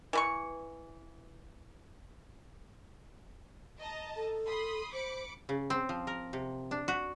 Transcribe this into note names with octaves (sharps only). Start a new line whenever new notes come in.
E3 B4 C#6
D#5 A5 A#5
A4
B5 C6 D#6
C5 B5 D6 C#7
C#3
C4
F3
A#4
C3
D4
F#4